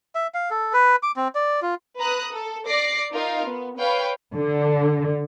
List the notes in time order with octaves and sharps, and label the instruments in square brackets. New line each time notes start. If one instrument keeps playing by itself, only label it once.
[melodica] E5
F5
A4
B4
D6
C4
D5
F4
[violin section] B4 A#5 D#6 F#6
A4
D5 D6 A#6 C7
D#4 F4 A#4 F5
B3
B4 C#5 F5 G5
[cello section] D3